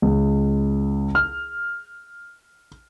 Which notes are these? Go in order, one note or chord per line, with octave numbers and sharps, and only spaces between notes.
C#2
F6